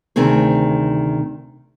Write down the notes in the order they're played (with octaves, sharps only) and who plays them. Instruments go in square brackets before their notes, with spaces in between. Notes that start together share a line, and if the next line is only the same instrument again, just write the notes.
[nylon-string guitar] D2 C3 D#3 C4 G#4